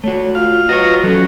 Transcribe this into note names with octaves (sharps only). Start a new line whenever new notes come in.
A3 F#4 C#5
F4 F5
F4 F#4 B4 C#5 D#5 A#5
F3 F#3 C#4 A4